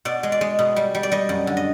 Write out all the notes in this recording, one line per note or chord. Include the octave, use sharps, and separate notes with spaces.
B2 D5
G#3
D5
G#3
B2
G3
G3
D5
G3 D#5
F#2
D3
D#5